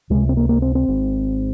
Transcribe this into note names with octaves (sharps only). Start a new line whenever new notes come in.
C#2 C3 G#3
C4
A#3
A#3
C4
C4
G#1 G#2